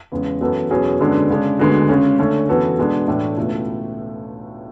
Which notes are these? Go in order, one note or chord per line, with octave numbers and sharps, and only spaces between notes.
E2 C#3 G#3
F#2 E3 B3 F#4 A4
E2 B2 F#3 C#4 G#4
F#2 D3 G#3 B3 D4
C#3 G#3 D4
D2 D3 G#3 B3 F#4
C#3 G#3 C#4
D3 A3 C#4
F#2 E3 B3 F#4 A4
B2 G#3 B3 D4
A2 E3 A3 D4
C#2 B2 A3 E4